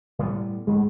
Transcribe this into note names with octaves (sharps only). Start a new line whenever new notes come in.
A2 G3 B3
G#2 G#3